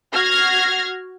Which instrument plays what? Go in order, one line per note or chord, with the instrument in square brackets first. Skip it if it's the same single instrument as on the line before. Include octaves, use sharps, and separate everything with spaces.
[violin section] F#4 F6 G#6 A#6 C7